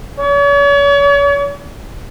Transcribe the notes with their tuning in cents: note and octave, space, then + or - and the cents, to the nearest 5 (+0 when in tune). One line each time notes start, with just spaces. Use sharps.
C#5 +40